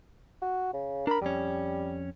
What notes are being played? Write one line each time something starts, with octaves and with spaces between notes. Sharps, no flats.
F#4
C#3
D4 A#4 B5
F2 G3 C#4